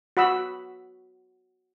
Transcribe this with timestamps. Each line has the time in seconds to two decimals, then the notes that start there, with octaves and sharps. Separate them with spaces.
0.17 F#4 F#5 B5 D#6 E6